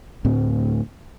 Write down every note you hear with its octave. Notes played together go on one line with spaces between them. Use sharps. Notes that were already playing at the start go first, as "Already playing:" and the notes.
D2 A2 C4